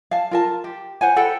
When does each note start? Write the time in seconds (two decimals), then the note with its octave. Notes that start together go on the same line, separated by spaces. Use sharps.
0.11 F5 A5
0.31 F4 A#4 A5
0.64 G4
1.01 C5 F#5 G#5
1.16 A4 F#5 G5 B5